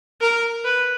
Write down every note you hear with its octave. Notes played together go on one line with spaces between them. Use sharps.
A#4
B4